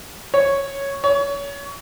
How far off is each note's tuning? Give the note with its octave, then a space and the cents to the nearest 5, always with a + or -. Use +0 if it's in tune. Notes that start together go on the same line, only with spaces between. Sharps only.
C#5 -5
C#5 +25